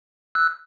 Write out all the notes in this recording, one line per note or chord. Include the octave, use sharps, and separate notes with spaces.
E6 F#6